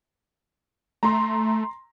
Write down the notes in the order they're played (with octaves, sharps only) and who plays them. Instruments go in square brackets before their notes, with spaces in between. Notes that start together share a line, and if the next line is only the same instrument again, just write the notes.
[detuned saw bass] A3 [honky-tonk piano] A#5 C6